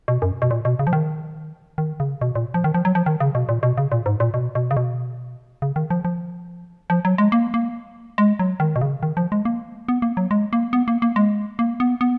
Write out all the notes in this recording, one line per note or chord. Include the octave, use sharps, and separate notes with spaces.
B2
F#2
B2
A#2
B2
C#3
F3
D#3
D#3
C#3
B2
A#2
F3
D#3
F3
F#3
F3
D#3
C#3
B2
A#2
B2
C#3
A#2
G#2
A#2
B2
B2
C#3
B2
C#3
D#3
F3
F3
F3
F#3
G#3
A#3
A#3
G#3
F#3
D#3
B2
C#3
D#3
F3
G#3
A#3
B3
A#3
F#3
G#3
A#3
B3
A#3
A#3
G#3
A#3
B3
B3